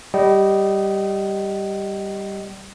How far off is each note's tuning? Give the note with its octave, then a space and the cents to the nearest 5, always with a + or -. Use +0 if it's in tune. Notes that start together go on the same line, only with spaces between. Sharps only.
G3 +0 D#5 +0 G5 -35